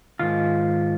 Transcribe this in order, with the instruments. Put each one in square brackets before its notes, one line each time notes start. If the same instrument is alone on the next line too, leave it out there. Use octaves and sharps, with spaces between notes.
[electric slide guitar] G#2 D#3 F4